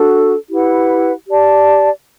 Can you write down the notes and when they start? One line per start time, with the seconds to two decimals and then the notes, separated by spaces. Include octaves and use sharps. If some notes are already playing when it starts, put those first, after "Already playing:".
Already playing: D4 F#4 A4
0.50 E4 G4 B4 F#5
1.27 G4 D5 A5